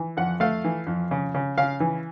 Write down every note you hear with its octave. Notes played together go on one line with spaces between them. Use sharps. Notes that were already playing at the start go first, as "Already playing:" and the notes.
Already playing: E3
F2 F#5
A3 F5
E3
F2
C#3
C#3
C#3 F5
E3